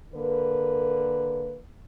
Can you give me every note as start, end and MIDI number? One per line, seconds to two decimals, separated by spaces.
0.15 1.57 50
0.15 1.57 58
0.15 1.57 70
0.15 1.57 71